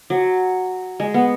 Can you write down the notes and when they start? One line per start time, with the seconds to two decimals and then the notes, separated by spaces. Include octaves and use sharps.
0.10 F#3
1.00 G#3
1.14 B3